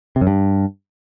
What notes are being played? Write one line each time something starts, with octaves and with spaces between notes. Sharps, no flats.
C3
F#2
G2